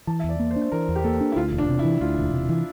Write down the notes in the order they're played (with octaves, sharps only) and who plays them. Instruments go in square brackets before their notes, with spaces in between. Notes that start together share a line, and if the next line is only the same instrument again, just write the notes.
[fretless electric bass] E3 [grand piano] A5
[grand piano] E5
[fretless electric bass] E2
[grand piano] D5
[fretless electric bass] A#3
[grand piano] C5
[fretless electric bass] D4
[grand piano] C5
[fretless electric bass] E3 [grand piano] A#4
[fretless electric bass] E2
[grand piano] G4
[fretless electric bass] A#3 [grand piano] A4
[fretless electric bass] D4
[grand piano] E4
[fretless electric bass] D2 [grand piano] F4
[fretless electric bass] E1
[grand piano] D4
[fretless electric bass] C3
[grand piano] E4
[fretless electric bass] E3
[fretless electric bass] D2 [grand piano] F4
[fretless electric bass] E1
C3
E3